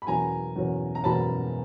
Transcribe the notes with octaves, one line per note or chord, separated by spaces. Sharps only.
B5
E2 B2 F#3 A#3 C#4 G#5 A#5
E2 B2 F#3 A#3 C#4
A#5
E2 B2 F#3 A#3 C#4 A5 B5